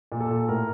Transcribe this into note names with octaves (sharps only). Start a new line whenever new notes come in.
A#2
A4
A#2
A2 A#4